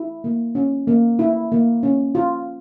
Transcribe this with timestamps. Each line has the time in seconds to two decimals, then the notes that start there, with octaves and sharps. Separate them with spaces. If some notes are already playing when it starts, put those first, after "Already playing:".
Already playing: E4
0.24 A#3
0.55 C#4
0.88 A#3
1.19 E4
1.52 A#3
1.83 C#4
2.15 F4